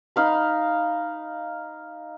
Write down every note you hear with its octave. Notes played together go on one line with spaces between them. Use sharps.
D#4 F5 B5